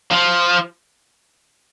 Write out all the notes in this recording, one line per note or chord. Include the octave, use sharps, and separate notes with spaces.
F3